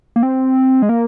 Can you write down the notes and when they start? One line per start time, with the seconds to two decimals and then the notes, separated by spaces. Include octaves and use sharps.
0.16 A#3
0.23 C4
0.82 G#3
0.89 A#3